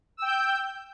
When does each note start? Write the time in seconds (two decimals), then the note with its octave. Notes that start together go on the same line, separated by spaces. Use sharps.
0.17 E6
0.22 G5
0.26 G6